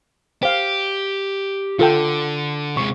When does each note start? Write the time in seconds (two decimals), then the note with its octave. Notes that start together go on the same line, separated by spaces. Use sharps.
0.43 G4 C5 F5
1.79 D3 F4 A4 G5
2.77 C3 G#3 C#6